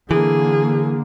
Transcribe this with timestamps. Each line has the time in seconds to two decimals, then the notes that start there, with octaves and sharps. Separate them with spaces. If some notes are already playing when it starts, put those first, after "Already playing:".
0.11 D3 E3 A#3 G#4